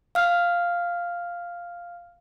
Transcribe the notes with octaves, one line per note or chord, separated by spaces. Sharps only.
F5 F6